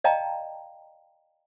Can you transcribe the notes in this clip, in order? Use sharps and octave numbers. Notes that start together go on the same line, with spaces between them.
D5 D#5 F5 G5 A5 A#5